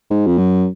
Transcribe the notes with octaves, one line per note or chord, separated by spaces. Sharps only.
G#2
F2
F#2